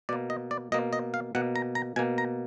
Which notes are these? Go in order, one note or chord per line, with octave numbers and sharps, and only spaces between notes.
B2 A#3 D5
D#5
D5
B2 A#3 D#5
D#5
F5
B2 A#3 F#5
A#5
A#5
B2 A#3 G#5
A#5